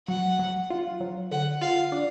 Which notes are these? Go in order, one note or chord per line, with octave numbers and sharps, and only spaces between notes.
F#3 F#5
F#3
F4
F#3
D3 F#5
F4 F5
D4